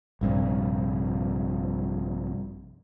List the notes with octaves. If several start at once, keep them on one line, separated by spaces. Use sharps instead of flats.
A#1 G2 C3